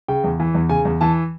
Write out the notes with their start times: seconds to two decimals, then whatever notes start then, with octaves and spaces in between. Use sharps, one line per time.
0.08 C#3 G5
0.24 E2
0.40 E3
0.55 E2
0.69 C#3 G#5
0.85 E2
1.01 E3 A5